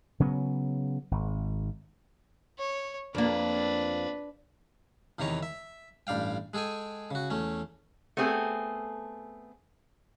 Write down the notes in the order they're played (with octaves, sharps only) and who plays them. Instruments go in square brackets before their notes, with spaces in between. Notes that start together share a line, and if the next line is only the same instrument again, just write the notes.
[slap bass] C#3 F#3 B3
G#1
[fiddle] C#5
[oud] F2 A#3 [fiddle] D4 B4
[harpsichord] E2 C3 D#3 E3 C#5 A#5
E5
A1 G2 D5 F5 G5
G#3 G#4 A4 G5 G#5
C#3 F#4
E2 A3 C#4
[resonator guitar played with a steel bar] A3 B3 C4 G#4 A4